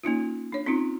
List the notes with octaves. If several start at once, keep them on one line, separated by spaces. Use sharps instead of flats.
A#3 C#4 D#4 F4
D4 C#5
C4 C#4 D#4 F4